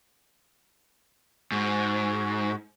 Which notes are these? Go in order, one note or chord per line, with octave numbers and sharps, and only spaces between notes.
G#2 F#4